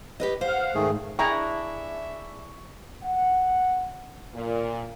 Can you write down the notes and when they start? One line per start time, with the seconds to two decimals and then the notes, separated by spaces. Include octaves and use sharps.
0.20 G4 B4 D#5
0.41 C5 F5 F#5
0.75 G#2 D#3 A3 G#4
1.19 D4 E4 G#4 E5 G5 A#5 C#6
3.03 F#5
4.34 A#2